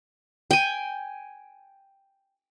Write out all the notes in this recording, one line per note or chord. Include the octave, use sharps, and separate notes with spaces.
G5 G#5